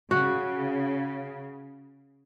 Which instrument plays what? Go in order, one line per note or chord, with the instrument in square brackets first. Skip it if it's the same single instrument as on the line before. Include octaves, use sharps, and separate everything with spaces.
[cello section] C#3 [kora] F#4